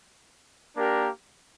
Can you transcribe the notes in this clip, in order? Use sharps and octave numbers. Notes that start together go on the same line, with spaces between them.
A#3 D4 G4 A#4